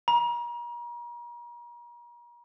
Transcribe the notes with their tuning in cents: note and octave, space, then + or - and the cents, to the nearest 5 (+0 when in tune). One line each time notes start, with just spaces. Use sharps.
A#5 +40